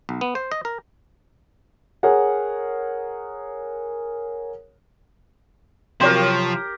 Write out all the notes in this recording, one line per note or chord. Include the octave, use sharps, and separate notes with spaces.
B1
B3
C5
D#5
A#4
G#4 A#4 C#5 F#5
C3 F3 F#3 G4 A#4 C#5 G5 C6